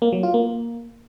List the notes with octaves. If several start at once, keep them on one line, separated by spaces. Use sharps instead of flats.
A#3
F#3
F4
A#3